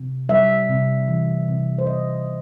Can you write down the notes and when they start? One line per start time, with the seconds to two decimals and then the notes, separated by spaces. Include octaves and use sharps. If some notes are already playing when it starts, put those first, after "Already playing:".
Already playing: C3
0.29 G3 E5
0.69 C3
1.08 E3
1.48 C3
1.78 C5
1.87 G3 D#5
2.26 C3